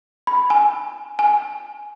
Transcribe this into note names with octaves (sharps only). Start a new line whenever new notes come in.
B5
G#5
G#5